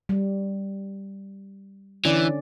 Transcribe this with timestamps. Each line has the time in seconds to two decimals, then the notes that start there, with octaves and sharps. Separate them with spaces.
0.09 G3
2.05 D3 E3 C#4 D5